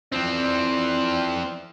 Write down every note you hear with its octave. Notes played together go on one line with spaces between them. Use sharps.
E3 F3 C4 E4 D5